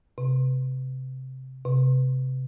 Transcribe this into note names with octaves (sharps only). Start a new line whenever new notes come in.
C3
C3